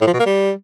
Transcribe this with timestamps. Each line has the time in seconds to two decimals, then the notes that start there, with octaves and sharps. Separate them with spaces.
0.01 A2
0.07 F3
0.13 B2
0.19 A#3
0.26 G3